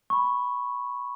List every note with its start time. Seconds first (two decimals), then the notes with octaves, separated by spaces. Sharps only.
0.10 B5 C#6